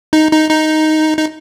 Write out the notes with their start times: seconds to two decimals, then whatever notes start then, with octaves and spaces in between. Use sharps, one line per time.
0.13 D#4
0.31 D#4
0.51 D#4
1.17 D#4